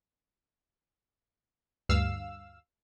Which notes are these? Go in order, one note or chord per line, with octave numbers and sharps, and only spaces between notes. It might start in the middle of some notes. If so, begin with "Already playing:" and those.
D2 G2 F5 E6